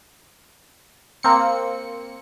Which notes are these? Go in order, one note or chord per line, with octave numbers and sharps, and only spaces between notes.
A#3 C4 C#7